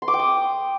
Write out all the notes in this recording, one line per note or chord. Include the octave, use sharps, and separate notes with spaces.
C6
D6
G5
D#6